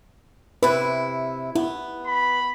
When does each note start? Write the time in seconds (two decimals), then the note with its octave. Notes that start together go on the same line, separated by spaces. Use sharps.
0.63 C3 E4 B4
1.55 B3 E4
2.07 B5